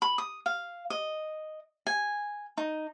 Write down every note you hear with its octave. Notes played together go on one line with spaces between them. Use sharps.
B5
D#6
F5
D#5
G#5
D#4